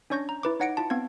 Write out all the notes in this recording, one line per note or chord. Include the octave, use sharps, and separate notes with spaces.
C#4 D4 C#5 C#6 G6 A#6
A#5
E4 B4 D6
D#4 C#5 F#5 A#6 C#7 D7
E4 F4 A5
B3 C4 F5 G#6